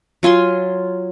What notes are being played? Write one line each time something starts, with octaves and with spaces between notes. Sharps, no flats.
F#3 F4 G#5 C6